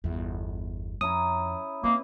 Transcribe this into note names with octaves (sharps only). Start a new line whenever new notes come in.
G1 E2
F2 C#4 E4 A#5 D#6
A#3 C4 B4 D#5